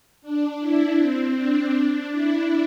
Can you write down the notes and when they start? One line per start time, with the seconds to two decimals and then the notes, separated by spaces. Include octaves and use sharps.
0.22 D4
0.60 E4
0.97 C4
1.35 D4
2.12 E4